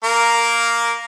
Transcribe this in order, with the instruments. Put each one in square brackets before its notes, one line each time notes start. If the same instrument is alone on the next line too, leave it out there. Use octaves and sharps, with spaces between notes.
[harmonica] A#3 A#4